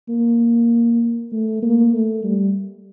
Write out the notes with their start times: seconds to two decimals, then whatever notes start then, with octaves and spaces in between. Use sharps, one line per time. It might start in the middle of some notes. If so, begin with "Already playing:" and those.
0.09 A#3
1.32 A3
1.63 A#3
1.93 A3
2.24 G3